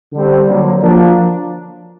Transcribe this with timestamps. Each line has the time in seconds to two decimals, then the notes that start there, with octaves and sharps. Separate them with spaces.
0.12 D3 G3 C4
0.46 D3 F#3 A#3
0.82 F3 A#3 D4